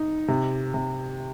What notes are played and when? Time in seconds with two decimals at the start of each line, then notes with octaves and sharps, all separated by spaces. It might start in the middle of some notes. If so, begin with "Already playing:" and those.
Already playing: D#4
0.28 C3
0.74 C3